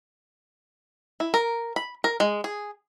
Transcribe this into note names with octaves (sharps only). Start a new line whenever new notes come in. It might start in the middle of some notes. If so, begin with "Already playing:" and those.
E4
A#4
B5
A#4
G#3
G#4